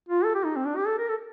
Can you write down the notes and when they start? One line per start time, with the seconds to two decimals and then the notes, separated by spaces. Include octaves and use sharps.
0.08 F4
0.24 A4
0.35 G4
0.45 D#4
0.56 C4
0.66 D4
0.77 G4
0.87 A4
0.98 A#4
1.08 A4